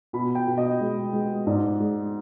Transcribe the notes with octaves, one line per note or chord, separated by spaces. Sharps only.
B2 B5
G5
B2
D#5
G#3
G#3
G#2 D5
G#3